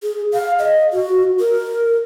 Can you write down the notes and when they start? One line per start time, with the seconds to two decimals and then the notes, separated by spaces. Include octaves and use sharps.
0.03 G#4
0.33 F5
0.59 D#5
0.93 F#4
1.40 A#4